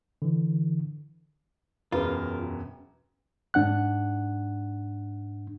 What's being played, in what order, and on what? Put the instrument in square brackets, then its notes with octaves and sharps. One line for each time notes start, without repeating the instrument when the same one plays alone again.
[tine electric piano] D3 E3
[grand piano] E1 F#2 [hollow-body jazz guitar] F4 [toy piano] G#4 B4 B5 [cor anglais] A#4
[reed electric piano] G#2 D4 F#5 F#6